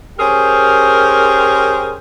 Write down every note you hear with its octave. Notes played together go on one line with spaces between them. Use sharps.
C#4 G4 G#4 A#4 C5